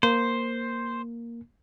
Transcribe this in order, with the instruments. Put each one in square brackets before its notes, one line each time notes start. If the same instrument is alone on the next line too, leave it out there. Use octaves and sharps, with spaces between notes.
[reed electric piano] A#3 [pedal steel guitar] C5